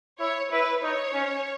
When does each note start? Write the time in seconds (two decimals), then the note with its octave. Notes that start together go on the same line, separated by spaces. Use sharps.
0.19 E4 C#5
0.51 E4 B4
0.82 D#4 C#5
1.14 C#4